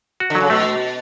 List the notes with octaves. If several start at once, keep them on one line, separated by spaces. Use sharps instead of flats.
F#4
D3
F#3
C#3
B2 A3